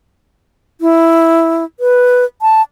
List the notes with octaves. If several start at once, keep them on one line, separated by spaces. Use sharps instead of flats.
E4
B4
A5